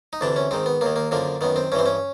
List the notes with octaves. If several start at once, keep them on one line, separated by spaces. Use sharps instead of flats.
D#4
D2 C3 E3 D4
C#4
G#2 D#3 C4
B3
D#2 D#3 A#3
A#3
F#2 D3 F3 A#3
F#2 D#3 B3
C4
G2 E3 C4 C#4
C#4